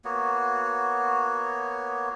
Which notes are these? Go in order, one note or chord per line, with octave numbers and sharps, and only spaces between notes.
A#3 B3 F#4 C#5